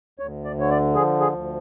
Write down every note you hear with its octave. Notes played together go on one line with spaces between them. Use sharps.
D2 C#5
D5
D3 C#5
D5
F3 G#4
G#4
D2